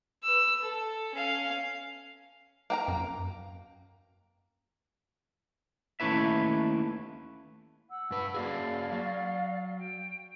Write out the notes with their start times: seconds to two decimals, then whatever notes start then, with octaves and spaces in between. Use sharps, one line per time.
0.23 B4 E6
0.61 A4
1.14 C#4 F5
2.70 A#3 G5 A#5
2.88 F#2
6.00 D#2 A3 C#4 E4 B4 E5
7.90 F#5 E6
8.11 G2 B4
8.34 A#3 F#4 G#4 D5 F5
8.92 F#3
9.79 G5